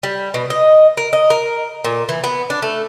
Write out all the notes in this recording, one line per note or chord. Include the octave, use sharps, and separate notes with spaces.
G3
B2
D#5
A#4
D#5
A#4
A#2
E3
B3
D4
A3